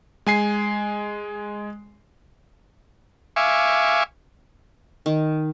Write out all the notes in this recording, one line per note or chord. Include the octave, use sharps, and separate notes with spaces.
G#3 G#5 C7
E5 F5 G#5 C#6 D6
D#3